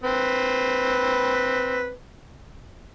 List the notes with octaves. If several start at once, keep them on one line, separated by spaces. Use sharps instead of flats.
C4 B4